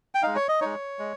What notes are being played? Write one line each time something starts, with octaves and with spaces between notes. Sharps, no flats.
G5
G#3 D#4 F5
C#5
D#5
G#3 D#4 C#5
G#3